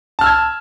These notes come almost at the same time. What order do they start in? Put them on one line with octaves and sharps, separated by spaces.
A5 F6 E6 G#6